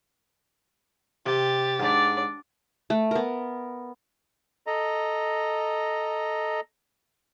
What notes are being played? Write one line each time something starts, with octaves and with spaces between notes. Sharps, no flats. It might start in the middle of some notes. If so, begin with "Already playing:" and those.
C3 G4 A6
G#2 D4 D5
A3
B3 A#4
A4 D#5 A#5